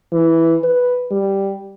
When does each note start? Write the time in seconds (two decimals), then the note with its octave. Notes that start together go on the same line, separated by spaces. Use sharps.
0.12 E3
0.64 B4
1.11 G3